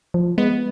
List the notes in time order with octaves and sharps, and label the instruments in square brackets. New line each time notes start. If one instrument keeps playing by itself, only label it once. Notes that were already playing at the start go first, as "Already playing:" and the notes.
[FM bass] F3
[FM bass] G#3 [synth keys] B3